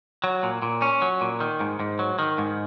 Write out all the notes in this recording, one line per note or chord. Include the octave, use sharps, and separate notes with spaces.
F#3
A#2
A#2
C#4
F#3
A#2
D#3
G#2
G#2
F#3
D#3
G#2